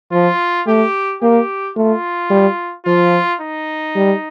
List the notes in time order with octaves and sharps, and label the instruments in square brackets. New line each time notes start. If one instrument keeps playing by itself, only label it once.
[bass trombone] F3 [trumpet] F4
[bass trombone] A3 [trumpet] G4
[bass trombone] A#3 [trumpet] G4
[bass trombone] A3 [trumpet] F4
[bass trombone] G3
[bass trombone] F3 [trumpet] F4
[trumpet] D#4
[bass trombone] G3